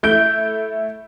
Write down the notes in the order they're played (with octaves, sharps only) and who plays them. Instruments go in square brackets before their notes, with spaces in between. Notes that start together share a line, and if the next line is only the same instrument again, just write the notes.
[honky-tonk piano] A3 E4 G6 D7